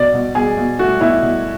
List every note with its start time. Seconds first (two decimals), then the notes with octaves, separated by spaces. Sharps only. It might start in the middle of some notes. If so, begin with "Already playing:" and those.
Already playing: B2 D5
0.13 B2
0.35 B2 G#4
0.57 B2
0.79 A3 F#4
1.01 B2 E4
1.22 B2